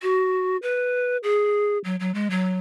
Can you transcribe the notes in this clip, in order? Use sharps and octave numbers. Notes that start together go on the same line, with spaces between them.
F#4
B4
G#4
F#3
F#3
G#3
F#3